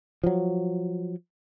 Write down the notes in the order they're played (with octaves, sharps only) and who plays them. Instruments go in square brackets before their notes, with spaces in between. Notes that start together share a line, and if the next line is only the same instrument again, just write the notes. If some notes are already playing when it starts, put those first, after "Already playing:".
[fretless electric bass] F3 F#3